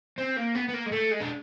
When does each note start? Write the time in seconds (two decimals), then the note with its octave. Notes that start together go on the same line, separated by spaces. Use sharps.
0.18 C4
0.36 A#3
0.55 B3
0.68 B3
0.74 A#3
0.86 G#3
0.92 A3
1.11 G#3
1.21 D4